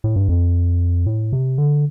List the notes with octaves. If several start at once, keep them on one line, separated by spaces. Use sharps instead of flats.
A2
G2
F2
A2
C3
D3